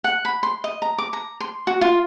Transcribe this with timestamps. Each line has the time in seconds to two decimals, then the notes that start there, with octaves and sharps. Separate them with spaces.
0.04 F#5
0.25 B5
0.43 C6
0.64 D#5
0.82 A#5
0.98 D6
1.13 A#5
1.40 C6
1.67 F#4
1.81 F4